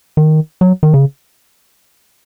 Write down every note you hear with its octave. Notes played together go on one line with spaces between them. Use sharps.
D#3
F#3
D#3
C#3